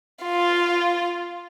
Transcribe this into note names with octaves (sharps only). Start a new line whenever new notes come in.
F4